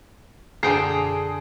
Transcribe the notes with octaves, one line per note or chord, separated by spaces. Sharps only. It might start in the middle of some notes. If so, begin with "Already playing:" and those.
F#2 B2 D3 G#4 G5 A#5 C7